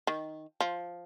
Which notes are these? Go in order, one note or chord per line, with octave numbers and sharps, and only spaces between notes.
D#3
F3